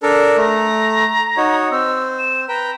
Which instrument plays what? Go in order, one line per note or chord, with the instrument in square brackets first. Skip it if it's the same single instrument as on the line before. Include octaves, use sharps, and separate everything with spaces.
[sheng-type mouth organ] D4 A4 A#4
[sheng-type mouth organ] A3 [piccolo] A#5
[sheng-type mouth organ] D#4 F#4 C#5
[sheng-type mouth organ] C4 [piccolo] E6
[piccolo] E7
[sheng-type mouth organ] B4 G5 [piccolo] A#5